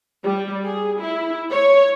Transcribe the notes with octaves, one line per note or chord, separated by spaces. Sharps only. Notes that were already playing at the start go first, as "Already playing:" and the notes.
G3
G#4
E4
C#5